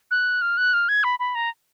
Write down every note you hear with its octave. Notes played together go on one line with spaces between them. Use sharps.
F#6
F6
F#6
F6
G#6
B5
B5
A#5